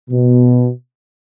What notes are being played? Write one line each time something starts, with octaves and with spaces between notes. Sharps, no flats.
B2